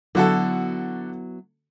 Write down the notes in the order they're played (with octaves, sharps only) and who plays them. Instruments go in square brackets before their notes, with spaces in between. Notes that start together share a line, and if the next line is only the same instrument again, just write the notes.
[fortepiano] D3 F#4 A4 [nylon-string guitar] F#3 B3 E4